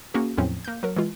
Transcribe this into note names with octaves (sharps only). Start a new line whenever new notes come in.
A#3 C#4 F#4 G#4
E2 A2 F3 F#3 C4 C#4
A#3 G6
F#3 A#4
E3 G#3 F4